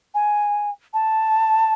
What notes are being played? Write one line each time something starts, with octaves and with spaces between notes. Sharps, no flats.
G#5
A5